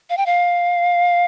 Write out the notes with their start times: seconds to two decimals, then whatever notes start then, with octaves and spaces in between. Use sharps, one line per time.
0.10 F5
0.17 G5
0.26 F5